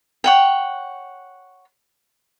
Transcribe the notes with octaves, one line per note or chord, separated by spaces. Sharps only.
C#5 F#5 G5